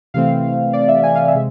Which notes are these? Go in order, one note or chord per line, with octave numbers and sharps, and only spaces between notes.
C3 E3 A3 C4 F5
D5
E5
G#5
F5
E5
C3 G#3